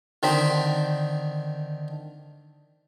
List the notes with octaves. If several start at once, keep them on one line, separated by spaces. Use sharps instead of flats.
D3 D#3 C4 D#4 B5